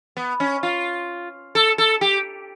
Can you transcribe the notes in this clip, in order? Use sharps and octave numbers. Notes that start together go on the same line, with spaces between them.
B3
C#4
F4
A4
A4
G4